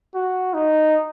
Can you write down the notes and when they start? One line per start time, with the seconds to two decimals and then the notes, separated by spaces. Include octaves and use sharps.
0.14 F#4
0.54 D#4